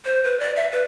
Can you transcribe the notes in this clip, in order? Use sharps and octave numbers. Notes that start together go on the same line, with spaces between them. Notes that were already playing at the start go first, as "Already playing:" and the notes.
C5
B4
D5
E5
B4